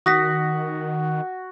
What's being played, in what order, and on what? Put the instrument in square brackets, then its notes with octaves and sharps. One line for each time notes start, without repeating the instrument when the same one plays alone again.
[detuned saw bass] D#3 [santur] F#4 [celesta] D#6 A#6 B6